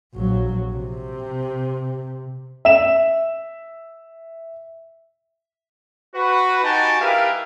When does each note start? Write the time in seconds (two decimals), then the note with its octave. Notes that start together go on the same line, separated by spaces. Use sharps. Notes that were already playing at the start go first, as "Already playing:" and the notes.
0.14 A#1 F#3
0.72 C3
2.65 E5 E7
6.15 F#4 B4
6.63 D#4 F#4 G4 G#5 A5
7.00 G3 E4 G4 A#4 B4 F5